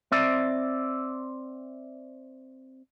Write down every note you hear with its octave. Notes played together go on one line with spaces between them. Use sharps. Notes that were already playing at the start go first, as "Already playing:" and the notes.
C4 D5 E5